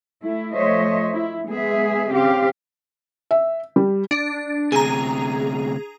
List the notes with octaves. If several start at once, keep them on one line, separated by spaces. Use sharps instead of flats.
A3 E4
F3 A3 C5 C#5 D#5 E5
E4
G#3 B3 G#4 E5
C#3 C4 G4 F5
E5
G3
D4
D2 C3 G#4 A#5